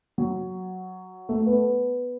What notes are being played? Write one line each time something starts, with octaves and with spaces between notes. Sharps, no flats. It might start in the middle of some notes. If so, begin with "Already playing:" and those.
F#3
A3
B3